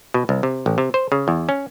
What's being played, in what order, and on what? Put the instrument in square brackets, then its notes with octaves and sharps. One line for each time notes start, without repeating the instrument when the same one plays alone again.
[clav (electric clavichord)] B2
C2
C3
A1
C3
C5
C#3
E2
C#4